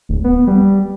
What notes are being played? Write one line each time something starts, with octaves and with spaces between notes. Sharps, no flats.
D1
B3
G3